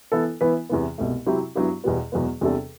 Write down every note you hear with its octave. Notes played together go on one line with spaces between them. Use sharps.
E3 B3 E4 A4
E3 B3 E4 B4
E2 C3 E3 B3
C2 B2 A3
C3 F#3 C4 E4 G4
G2 F#3 B3 E4 G4
E2 B2 G3 B3
E2 B2 F#3 B3
E2 C3 G3 D4 A4